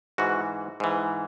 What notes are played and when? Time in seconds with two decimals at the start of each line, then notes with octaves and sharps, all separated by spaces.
0.18 G#2 E3 F#4
0.80 G#2 E3